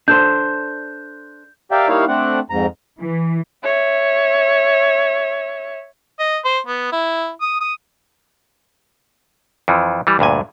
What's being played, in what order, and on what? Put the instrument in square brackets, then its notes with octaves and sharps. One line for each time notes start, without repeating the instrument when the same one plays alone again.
[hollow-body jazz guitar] D4 A4 C5 [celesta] G6
[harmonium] G4 A#4 D5 E5 F5 G5
G3 A#3 D#4 E4 C#5 F5
A3 C4 D4 F#5
F2 G#2 A#5
[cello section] E3
[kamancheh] C#5 E5
[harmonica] D#5
C5
B3
E4
D#6
D#6
[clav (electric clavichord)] F2 E3 F3
E3 G3
D2 G2 A#2 G#5